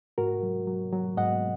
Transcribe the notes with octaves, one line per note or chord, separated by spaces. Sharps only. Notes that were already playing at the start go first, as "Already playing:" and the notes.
G#2 F#4 A#4
F#3
F#3
F#3
G#2 D#5 F#5